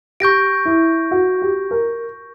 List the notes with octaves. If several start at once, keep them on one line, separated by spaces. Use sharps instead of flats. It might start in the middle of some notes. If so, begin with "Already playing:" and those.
G4 C#6 G6 A#6 D7
E4
F#4
G4
A#4